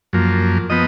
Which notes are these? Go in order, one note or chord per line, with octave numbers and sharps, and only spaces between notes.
F#2 F3 A#3
F3 B3 D#5